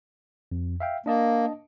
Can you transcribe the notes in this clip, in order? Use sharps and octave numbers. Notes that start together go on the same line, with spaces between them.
F2
E5 F5 G5
A#3 D4 D#5 A5